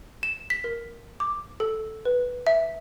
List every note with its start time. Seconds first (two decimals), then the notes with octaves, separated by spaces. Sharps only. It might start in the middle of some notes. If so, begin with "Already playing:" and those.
0.23 E7
0.50 B6
0.64 A#4
1.20 D6
1.60 A4
2.05 B4
2.47 E5